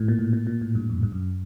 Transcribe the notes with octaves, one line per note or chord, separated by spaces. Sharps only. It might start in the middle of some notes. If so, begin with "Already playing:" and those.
Already playing: A2
A#2
A2
A#2
A#2
A2
G2
F2
G2
F#2